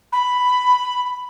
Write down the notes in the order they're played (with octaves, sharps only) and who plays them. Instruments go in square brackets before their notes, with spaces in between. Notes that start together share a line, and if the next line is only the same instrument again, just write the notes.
[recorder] B5